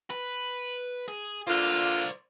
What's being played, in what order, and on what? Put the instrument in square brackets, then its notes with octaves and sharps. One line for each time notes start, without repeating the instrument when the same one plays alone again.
[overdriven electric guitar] B4
G#4
[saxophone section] D3 A#3 F4 [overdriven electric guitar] C5 D5